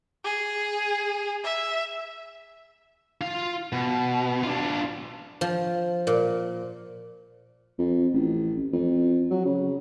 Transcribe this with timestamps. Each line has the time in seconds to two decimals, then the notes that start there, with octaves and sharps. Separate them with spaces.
0.25 G#4
1.44 E5
3.21 F4 F5
3.72 B2
4.43 D4 F4
5.41 F3
6.07 A#2
7.79 F2
8.13 A1
8.73 F2
9.30 F#3
9.45 C#3